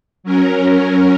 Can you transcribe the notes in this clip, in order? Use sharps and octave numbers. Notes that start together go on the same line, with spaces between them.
F#3 C#4 A#4